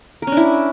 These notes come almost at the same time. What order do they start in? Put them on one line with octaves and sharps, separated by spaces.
A#4 C#4 D4 E4